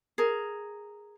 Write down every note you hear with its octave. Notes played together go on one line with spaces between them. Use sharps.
G#4 A#4